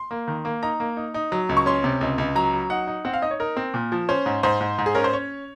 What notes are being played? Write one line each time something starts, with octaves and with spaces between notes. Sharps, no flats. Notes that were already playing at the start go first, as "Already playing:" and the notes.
Already playing: C6
A#3
D#3
A#3
D#4 A#5
A#3
D#4
D#4
F#3
C#2
C#6
C#4 C6
C3
C#2
C#2
F#3 A#5
F#3
D#4 F#5
D#4
C4 F#5
F5
D#4 D#5
C#5
D#4 A#4
C4
A#2
F3
C#4 C5
G#2
G#2 C5
G#2
G#2
G#4
C#4 A#4
C5
C#4 C#5